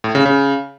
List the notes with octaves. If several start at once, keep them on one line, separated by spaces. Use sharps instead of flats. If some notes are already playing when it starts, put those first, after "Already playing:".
A2
C#3
C#3